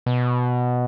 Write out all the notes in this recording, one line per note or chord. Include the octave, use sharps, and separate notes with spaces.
B2